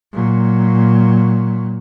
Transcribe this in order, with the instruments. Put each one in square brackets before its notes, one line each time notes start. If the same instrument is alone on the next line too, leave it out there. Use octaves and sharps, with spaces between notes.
[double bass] A#2 F#3